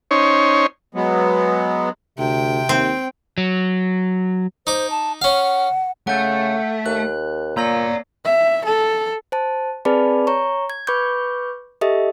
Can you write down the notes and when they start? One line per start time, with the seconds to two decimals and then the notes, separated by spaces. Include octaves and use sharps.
0.11 C#4 D#4 C5 C#5
0.95 F#3 G#3 B3
2.18 D2 C3 G5
2.69 D#2 C4
3.38 F#3
4.67 D#4 C5 D6
4.91 A5
5.22 C#4 F5 F#5
6.07 C#3 A3 F#5 G6
6.86 D#2 F#6
7.57 A#2 A#3 C#5 D5 A#5 A#6
8.25 E5
8.65 A4
9.32 C5 A5
9.85 C4 G#4 B4 D5 A5 B5
10.27 C#5 A#5 C#6
10.70 G#6
10.87 B4 B5 C#6 D6 G6
11.81 G4 A4 D#5 E5